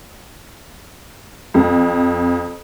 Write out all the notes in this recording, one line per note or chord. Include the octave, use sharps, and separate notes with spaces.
F2